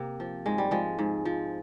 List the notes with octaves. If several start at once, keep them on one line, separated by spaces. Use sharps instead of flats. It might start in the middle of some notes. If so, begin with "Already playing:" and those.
Already playing: C3 A#3
F3
G#2 G#3
G3
F3 G#3
G#2
F3